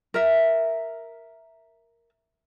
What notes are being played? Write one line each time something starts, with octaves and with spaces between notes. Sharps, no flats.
A#4 E5